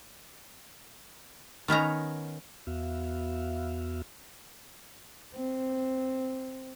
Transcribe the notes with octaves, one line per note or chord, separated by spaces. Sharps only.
D#3 B3 C#4 A#5
E2 B3 F#4 E5 F5
C4